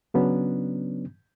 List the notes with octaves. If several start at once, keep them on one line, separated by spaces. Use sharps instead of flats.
C#3 F#3 B3 C#4 D4